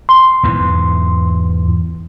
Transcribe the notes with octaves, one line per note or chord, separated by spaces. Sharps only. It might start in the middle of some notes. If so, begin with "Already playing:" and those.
C6
E2 G#2 E3